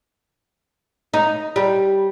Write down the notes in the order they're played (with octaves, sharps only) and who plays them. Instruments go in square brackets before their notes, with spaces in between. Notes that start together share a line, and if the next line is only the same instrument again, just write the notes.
[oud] D#4
G3